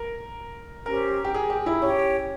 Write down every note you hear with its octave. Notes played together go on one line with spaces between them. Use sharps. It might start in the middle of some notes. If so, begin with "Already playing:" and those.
Already playing: A#4
C#4 G4 A#4 C5
G4
G#4
G4
E4
C#4 G4 C#5 G5